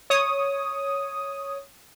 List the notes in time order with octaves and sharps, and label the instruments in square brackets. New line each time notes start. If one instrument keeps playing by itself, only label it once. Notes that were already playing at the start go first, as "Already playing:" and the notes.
[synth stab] C#5 D#6